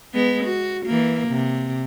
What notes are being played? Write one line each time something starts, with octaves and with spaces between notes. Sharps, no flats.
G#3 B3
F#4
E3 A#3
C3